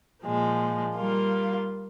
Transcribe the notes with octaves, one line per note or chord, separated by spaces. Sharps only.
A#2 F3 G#3
G3 A#3 F4